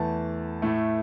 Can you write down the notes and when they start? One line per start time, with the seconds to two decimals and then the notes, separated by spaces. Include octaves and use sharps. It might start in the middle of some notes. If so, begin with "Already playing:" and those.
Already playing: E2 E3 A3 A5
0.62 A2 A3